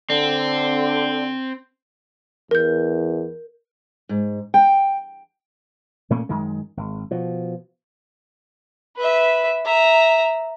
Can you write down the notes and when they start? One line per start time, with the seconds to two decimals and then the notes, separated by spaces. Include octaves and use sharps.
0.10 D3 C4
2.51 E2 A#4 G6
4.09 G#2
4.54 G5
6.10 A#2 A3 A#3 C#4
6.29 F#2 D#3 G#3
6.77 G#1
7.11 B2 F3
8.96 B4 E5
9.65 E5 A#5